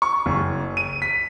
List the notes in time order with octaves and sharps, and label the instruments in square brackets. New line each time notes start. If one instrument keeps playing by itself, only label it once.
[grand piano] C#6
F#1
D#7
B6